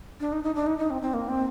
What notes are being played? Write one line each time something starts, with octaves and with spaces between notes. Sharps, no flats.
D4
D#4
D#4
D4
D#4
D#4
C4
C4
A#3
C4